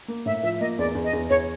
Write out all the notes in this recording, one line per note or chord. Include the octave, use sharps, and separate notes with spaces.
A#3
A2 E5
F3 E5
A#3 D#5
E2 D5
E2
D#5
E2
E2 C#5